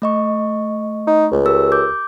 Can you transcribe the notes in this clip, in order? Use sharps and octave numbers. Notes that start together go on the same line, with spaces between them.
A3 D#5 C#6
D#4
C#2
G4 A#4 E6
D6 G6